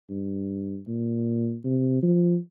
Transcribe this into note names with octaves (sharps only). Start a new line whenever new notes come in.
G2
A#2
C3
F3